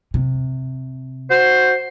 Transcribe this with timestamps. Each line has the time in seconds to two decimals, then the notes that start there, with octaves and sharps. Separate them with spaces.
0.14 C3
1.30 F#4 C5